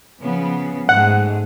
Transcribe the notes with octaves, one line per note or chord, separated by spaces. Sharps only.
C#3 F3 B3
G#2 G#3 A3 F#5